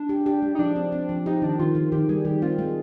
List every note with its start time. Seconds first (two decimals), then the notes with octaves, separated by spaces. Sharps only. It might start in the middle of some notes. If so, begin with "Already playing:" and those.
Already playing: D4
0.09 G4
0.26 G4
0.42 G#3
0.55 D#4
0.59 F3 D4
0.76 C4
0.92 C4
1.09 F3
1.26 D#4 G4
1.42 D#3 D4
1.59 D#3 F4
1.75 D#3
1.92 D#3 G4
2.09 G3 G#4
2.25 D#3 G4
2.42 C4 F4
2.58 G#3